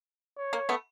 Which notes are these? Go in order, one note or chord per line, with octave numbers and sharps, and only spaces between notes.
C#5
A#3
A3 B3